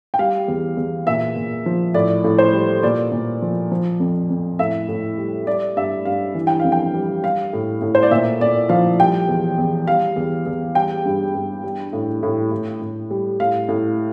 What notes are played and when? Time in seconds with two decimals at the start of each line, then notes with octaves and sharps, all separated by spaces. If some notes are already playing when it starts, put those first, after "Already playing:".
0.14 G5
0.19 G3 F5
0.48 E2
0.77 E2
1.07 A#2 E5
1.36 A#2
1.66 F3
1.94 A2 D5
2.24 A2
2.38 C5
2.53 G3
2.83 A#2 D5
3.12 A#2
3.42 F3
3.71 F3
4.00 F2
4.30 F2
4.59 A2 E5
4.89 A2
5.18 G3
5.47 G3 D5
5.76 G2 E5
6.05 G2 F5
6.35 E3
6.47 G5
6.60 F2 F5
6.72 G5
6.94 G3
7.23 G3 F5
7.53 A2
7.82 A2
7.95 C5
8.03 D5
8.11 A#2 E5
8.40 A#2 D5
8.69 F3 F5
9.00 G3 G5
9.28 E2
9.58 E2
9.87 G3 F5
10.16 E2
10.46 E2
10.75 G3 G5
11.05 G2
11.35 G2
11.64 G3
11.93 A2
12.23 A2
12.51 A2
12.82 A2
13.11 G3
13.40 A2 F5
13.69 A2